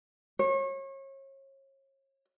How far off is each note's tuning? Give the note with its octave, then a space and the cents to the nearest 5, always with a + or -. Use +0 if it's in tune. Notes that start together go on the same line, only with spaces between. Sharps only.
C#5 -35